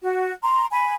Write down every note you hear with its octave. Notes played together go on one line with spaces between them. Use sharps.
F#4
A#5 C6
G#5 B5